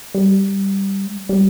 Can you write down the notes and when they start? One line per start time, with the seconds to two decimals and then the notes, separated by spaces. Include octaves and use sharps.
0.15 G3
1.06 G#3
1.29 G3